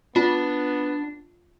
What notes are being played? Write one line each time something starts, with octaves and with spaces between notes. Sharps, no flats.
B3 D4 F4